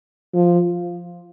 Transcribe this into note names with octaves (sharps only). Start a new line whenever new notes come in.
F3